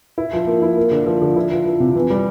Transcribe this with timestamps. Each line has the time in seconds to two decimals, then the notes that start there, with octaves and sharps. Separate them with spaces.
0.18 E4
0.33 F3
0.47 A#3
0.62 E4
0.77 A#3
0.91 D3
1.06 F3
1.22 D3
1.36 E4
1.51 F3
1.65 F3
1.80 C3
1.95 E3
2.10 G3